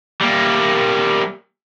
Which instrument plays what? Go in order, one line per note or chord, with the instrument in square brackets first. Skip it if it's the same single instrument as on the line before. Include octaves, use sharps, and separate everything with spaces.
[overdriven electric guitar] G3 A#3